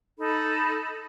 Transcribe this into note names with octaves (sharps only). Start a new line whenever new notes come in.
D#4 A4 B5